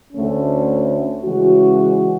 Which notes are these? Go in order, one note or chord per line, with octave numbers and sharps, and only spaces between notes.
D2 D3 A3 C#4
C#3 E3 G#3 C#4 F#4